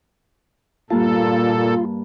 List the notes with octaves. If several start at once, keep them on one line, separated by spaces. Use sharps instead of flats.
G2 A#2 A#3 F4 A4 A5